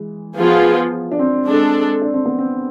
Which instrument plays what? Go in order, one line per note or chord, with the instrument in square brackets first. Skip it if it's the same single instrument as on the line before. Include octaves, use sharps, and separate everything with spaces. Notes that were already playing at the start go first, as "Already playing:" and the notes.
Already playing: [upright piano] E3 G#3
[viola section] F3 B3 F4 G#4
[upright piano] D4
C4
[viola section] G#3 D4 A4
[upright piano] D4
C4
B3
C4